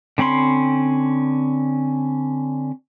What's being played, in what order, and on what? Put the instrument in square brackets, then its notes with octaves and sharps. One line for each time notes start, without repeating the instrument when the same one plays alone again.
[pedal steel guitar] D3 C4 C#4 B5 C6